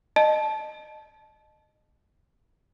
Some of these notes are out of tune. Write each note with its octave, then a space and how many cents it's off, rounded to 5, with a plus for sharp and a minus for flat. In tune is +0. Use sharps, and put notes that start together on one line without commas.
D#5 -20 A5 -15